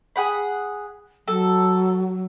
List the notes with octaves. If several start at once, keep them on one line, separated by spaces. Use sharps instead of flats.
G#4 F#5 B5
F#3 A4